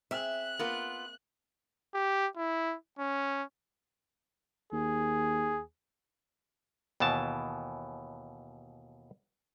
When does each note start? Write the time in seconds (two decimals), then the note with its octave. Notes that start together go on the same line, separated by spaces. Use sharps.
0.11 C4 G#4 E5 F#6
0.59 A#3 B3 F4 A#4
1.94 G4
2.36 E4
2.99 C#4
4.73 D#2 G#4
7.00 D#2 B2 E3 A5